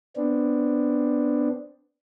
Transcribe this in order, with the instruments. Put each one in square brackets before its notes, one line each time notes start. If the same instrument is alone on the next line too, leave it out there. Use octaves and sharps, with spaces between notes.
[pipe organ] B3 C4 D4